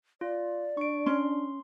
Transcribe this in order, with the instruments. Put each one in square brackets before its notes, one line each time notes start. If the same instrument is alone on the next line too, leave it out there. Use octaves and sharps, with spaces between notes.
[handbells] F4 [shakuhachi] D5
[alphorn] D4 [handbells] C#6 D7
[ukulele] C#4 [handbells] C6